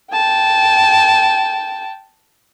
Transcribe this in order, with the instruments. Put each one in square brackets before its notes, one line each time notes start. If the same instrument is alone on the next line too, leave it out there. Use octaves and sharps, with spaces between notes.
[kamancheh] G5 A5